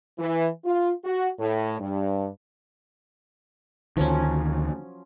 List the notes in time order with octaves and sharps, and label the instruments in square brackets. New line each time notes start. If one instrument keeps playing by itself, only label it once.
[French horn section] E3
F4
F#4
A2
G2
[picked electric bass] D2 D3 D#3 [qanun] F3 F#3 C#4